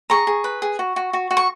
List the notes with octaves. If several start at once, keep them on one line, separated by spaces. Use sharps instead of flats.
G#4 A#5 C#6
G#4
B4
G#4
F#4
F#4
F#4
F#4
C#6